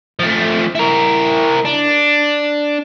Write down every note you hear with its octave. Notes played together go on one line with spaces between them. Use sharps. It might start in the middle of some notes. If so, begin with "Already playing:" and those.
F3 A3
E4 A#4
D4